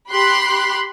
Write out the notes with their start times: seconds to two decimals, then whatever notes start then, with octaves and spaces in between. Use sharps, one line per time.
0.11 G4 B5 C6 F#6